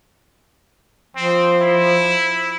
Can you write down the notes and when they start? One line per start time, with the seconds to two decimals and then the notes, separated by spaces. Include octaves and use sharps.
1.16 F3 C4
1.60 E4